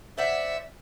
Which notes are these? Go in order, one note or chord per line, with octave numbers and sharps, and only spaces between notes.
C5 D5 E5 F#5